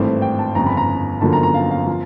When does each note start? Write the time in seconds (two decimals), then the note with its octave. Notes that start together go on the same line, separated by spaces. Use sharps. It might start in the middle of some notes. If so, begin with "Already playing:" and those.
Already playing: G#1 G2 E3 A3 C4
0.22 G5
0.39 A5
0.55 G1 F2 C#3 A#5
0.67 B5
0.77 A#5
1.21 G1 F#2 D3 F3 A#3 A5
1.33 A#5
1.43 A#5
1.54 F5
1.71 F5
1.87 F3